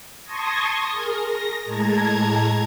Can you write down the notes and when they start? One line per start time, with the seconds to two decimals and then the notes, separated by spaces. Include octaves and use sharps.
0.23 A5 C6 C#6 D#6 G#6 A#6
0.91 G#4 A#4
1.23 A#6
1.65 A2 G#3 A5 A#5 G#6